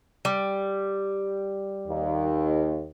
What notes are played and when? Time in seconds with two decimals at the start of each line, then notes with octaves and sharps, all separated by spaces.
0.25 G3
1.87 D#2